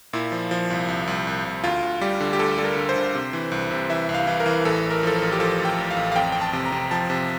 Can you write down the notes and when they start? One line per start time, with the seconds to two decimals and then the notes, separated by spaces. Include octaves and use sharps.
0.13 A#2 E4
0.32 F3
0.51 F3
0.70 C2
0.88 C2
1.07 C2
1.27 C2
1.45 C2
1.64 D2 F4
1.83 D2
2.01 G3 G4
2.21 D3
2.33 G4
2.39 D2 A4
2.58 G3 A4
2.64 A#4
2.77 D3
2.89 C5
2.96 D3
3.15 C3
3.33 E3
3.52 C2
3.71 C3
3.90 E3 E5
4.09 C2
4.14 F5
4.27 E3
4.40 A#4
4.46 E3
4.65 A1 A4
4.83 A1
4.91 A#4
5.03 F3 A4
5.16 A#4
5.22 A1
5.32 G4
5.40 F3 A4
5.60 A1
5.65 G5
5.78 A1
5.91 F5
5.97 A1
6.12 F5
6.16 F2 G5
6.32 F2 G5
6.41 A5
6.53 C3
6.66 A#5
6.72 C3
6.91 F3 A5
7.10 C3